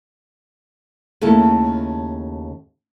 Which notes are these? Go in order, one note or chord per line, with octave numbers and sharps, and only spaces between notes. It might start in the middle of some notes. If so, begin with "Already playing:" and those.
D#2 C#3 A3 E4 A4 A5